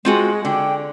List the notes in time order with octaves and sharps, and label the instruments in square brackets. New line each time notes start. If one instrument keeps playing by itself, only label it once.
[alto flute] G#3 [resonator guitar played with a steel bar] C4 F4 F#4
[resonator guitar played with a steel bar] D3 [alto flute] G5